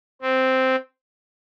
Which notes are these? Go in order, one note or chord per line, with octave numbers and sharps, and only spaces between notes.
C4